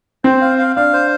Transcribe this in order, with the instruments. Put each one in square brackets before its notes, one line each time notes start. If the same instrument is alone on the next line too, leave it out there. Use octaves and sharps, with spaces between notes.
[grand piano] C4 [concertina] C5
[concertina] F5
F5
[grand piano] D4 [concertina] F5
[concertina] C5